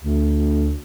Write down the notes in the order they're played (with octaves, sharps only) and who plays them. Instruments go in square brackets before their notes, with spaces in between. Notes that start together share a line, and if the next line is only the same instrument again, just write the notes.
[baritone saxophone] D2